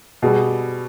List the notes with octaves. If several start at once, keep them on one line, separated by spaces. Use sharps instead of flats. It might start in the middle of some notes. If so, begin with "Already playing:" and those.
B2 G3 G#4